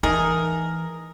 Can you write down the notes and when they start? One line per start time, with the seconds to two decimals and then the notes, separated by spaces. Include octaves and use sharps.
0.03 E3 A3 D#4 G#4 A#4